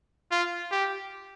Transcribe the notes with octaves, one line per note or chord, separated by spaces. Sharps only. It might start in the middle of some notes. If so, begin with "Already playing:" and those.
F4
G4